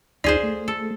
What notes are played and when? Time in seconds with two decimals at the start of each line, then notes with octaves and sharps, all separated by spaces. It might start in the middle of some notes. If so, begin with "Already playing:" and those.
0.24 D2 D#4 F4 G#4 C5 D5
0.43 A3
0.68 A4